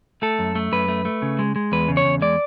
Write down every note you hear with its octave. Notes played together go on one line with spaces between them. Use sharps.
A3 A4
F#2
A3
F#2 B4
A3
A3
C#3
G#3
G#3
E2 B4
C#3
C#5
E2
G#3 D5